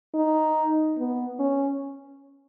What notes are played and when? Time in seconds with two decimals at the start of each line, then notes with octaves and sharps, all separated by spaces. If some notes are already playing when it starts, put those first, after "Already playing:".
0.14 D#4
0.98 B3
1.39 C#4